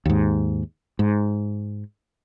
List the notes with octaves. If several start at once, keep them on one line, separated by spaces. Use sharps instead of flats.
D#2 G#2
G#2